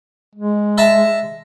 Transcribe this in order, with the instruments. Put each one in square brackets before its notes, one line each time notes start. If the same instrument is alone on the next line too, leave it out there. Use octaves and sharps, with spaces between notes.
[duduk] G#3
[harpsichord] E5 A5 A#5